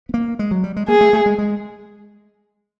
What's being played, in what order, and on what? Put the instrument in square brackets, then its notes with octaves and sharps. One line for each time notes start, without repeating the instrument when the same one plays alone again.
[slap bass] B3
A#3
G#3
F#3
G3
G#3
[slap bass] A#3 [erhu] G#4
[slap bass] A3
A3
G#3
G#3